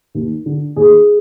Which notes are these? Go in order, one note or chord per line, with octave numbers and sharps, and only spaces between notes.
D#2
D3
D#2 G#4